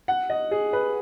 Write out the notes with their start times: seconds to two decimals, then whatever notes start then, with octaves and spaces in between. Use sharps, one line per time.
0.08 F#5
0.30 D#5
0.51 G#4
0.73 B4